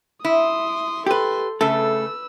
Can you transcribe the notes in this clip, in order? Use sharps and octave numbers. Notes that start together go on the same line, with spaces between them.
E4 C6 D#6
G4 A4 B4 C6
C#3 A3 A4 B4 E6